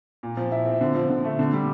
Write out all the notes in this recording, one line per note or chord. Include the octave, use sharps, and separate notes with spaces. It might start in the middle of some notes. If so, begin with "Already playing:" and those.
A#2
F3
E4
C4
D3
F3
D3
A3
D3
G3